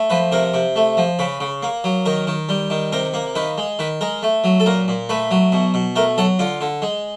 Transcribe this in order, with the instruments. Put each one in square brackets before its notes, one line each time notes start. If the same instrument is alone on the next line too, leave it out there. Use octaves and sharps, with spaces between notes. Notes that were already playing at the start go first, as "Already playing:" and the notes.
Already playing: [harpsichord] A3
F3 B4
C3 A#4
C3
A3
F3
C#3 B4
C#3
A#3
F#3
D#3 A#4
D#3
G3
D#3
C3 A#4
A#3
D#3 B4
G#3
D#3 B4
G#3 A#4
A3
F#3
A4
A#2 A#4
A#2
A3 B4
F#3
B2
B2
A3 A#4
F#3 A4
D3 F4
D3
G#3